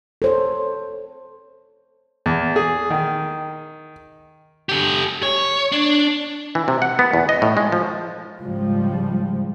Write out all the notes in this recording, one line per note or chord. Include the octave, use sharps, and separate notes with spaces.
A4 C5 C#5
E2
G#4
D#3
G4 A4
C#5
D4
E3
C3
F#5
B3
E2
D#5
A2
G#3
F3
G#2 C#3 F3 G3 G#3